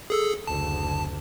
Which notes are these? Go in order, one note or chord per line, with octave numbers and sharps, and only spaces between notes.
G#4 A4 E6
F#1 D2 A5